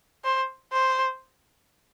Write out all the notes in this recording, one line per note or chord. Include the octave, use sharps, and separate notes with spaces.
C5
C5